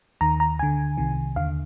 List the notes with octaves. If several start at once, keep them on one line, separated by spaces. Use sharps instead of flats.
D#2 D#3 A#5
A#5
D2 D3 G#5
C2 C3 D#3
D#2 D3 F5